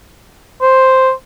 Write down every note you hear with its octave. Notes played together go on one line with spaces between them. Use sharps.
C5